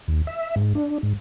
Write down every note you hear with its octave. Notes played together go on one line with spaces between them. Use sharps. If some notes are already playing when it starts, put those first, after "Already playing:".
D#2
E5
G#2
D4
G#2